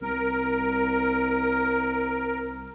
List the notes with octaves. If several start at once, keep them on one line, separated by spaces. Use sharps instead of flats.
C2 A#4